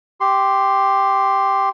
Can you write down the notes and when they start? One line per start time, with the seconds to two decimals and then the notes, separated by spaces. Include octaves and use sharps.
0.21 G4 C6